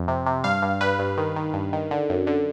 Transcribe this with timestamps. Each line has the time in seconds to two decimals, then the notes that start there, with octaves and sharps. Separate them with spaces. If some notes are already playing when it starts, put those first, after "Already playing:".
Already playing: F2
0.08 C3
0.26 C3
0.44 G2 F5
0.62 G2
0.81 G2 B4
0.99 G2
1.17 D#3
1.36 D#3
1.54 G2
1.73 D#3
1.91 D3
2.09 F#2
2.27 D3